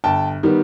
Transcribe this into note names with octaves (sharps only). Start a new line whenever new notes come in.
G1 G5 A5
D#3 G3 B3